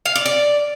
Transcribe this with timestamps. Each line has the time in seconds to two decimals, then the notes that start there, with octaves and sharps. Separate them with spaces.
0.06 F5
0.16 D5
0.26 D5